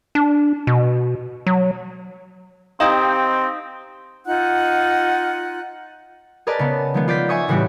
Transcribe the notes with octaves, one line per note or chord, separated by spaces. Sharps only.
D4
B2
F#3
C4 D#4 G4 D#5 F5
D#4 F4 F#5 F#6
G#4 A#4 B4 D5 D#5 A5
C#3 B3
D#3 F3 G#3 A3 B3
F4 D5 G6 B6
E5 G#5 C#6 D#6
A2 C#3 E3 G3 F#4 G4